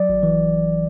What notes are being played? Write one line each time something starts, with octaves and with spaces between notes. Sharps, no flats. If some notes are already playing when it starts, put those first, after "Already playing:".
Already playing: F#3 D5
G#1
E3